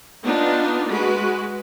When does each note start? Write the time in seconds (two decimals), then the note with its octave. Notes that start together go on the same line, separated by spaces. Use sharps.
0.24 B3 D4 D#4 F4
0.88 G#3 F#4 B4